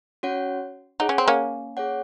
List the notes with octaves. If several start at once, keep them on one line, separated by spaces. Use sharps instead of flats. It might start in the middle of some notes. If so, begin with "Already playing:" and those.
C#4 F#4 C#5 F#5
D#4 G#4 C#5 F#5
C#4
C4
A#3 C#4
G#4 C#5 F#5